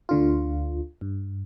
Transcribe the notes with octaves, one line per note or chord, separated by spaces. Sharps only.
D2 D3 F4
G2